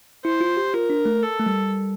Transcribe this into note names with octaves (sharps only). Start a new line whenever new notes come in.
E4 C5
F4
G4
F4 A#4
D4
A3
A4
A3
G3